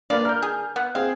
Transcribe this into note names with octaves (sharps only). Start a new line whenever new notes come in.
A#3 D4 B4 D5 F5
A#4 F6 G6
G#4
B3 F#5
C4 G#4 F5